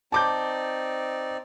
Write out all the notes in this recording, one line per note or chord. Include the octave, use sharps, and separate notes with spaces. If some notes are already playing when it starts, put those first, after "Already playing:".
C4 D#4 D5 A5 D6 G6